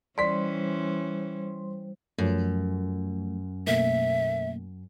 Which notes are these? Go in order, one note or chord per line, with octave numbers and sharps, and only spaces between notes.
E3 G3 C#4 C5 D5 C6 B6
F#2 F3 A3
B2 A3 A#3 E5